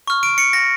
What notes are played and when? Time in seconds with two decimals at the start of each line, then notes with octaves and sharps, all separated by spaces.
0.07 C#6 F6
0.23 D7
0.38 C#7
0.53 A#6